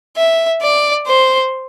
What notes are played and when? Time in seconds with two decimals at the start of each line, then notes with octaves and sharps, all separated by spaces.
0.17 E5
0.62 D5
1.07 C5